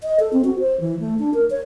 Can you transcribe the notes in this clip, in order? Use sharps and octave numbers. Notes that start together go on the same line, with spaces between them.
D#5
A4
C4
F#4
C5
E3
A3
D4
A#4
C#5